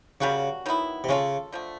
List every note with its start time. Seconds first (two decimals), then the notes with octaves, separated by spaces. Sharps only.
0.21 C#3 G3 A#3 C#4 F#4
0.66 D#3 F#3 B3 E4
1.04 C3
1.09 C#3 G#3 C#4 F4 A4
1.52 D3 F3 A3